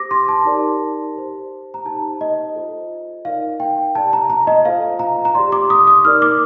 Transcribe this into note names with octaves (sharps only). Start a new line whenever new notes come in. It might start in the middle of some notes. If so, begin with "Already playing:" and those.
Already playing: G4 C5 D6 A#6
C6
A5
D#4 G4 A#4 D5
G4 C5
A#5
D#4 G4 C5 A5
D#5
F4 A4 C5
D#4 A#4 D5 F5
G5
G4 D5 A5
A#5
A#5
D#5
F4 A4 C5 F5
A#5
A#5
G4 D5 C6
D6
D#6
D#6
D#4 A#4 D5 F6
D6